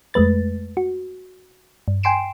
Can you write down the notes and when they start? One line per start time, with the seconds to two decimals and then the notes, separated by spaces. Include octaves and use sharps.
0.14 F2 G#3 A3 B4 A6
0.77 F#4
1.88 G2
2.03 G5 G#5 C6 C7 D7 E7